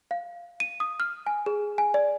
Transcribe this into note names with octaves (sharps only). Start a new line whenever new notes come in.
F5
D#7
D#6
F6
G#5
G#4
G#5
D5